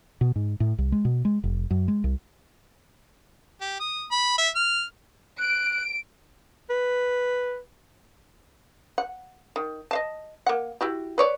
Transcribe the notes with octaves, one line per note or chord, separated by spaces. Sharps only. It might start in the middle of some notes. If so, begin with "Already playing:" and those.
B2
G#2
A2
C2
G#3
B2
G#3
F1
F#2
G#3
C2
G4
D#6
B5
E5
F6
F#6 D7
B4
F#5
D#3
D#5 F5 A5
A#3 F#5
E4 F#4 G4
B4 C#5 D5